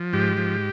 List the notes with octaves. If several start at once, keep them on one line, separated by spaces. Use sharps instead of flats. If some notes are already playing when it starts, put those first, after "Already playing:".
Already playing: F3
G#2 G4
F3